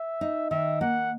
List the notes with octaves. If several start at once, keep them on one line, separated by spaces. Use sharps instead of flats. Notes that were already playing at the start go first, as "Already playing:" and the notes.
Already playing: E5
D#4
D#3 E5
A#3 F#5